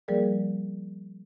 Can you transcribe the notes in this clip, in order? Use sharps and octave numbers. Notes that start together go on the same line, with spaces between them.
F3 G3 A#3 G#4 A#4 D5